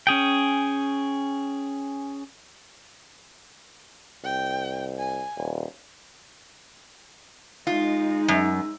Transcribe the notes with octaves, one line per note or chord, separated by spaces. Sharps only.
C#4 G#4 G5
C2 G5
G#5
D#1
G#3 D#4 F4
F#2